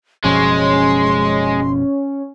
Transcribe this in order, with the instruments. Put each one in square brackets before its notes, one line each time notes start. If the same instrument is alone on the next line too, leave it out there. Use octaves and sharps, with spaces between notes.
[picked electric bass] F#1 B2 F3 [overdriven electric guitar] G#3 [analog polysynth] C#4 [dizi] C6